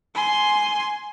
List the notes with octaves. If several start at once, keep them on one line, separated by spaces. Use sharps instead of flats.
G#5 C6